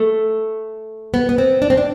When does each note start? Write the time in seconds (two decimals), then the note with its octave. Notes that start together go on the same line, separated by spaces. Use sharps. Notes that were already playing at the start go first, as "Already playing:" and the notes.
Already playing: A3
1.14 B3
1.29 B3
1.38 C4
1.62 D4
1.70 C4
1.77 D4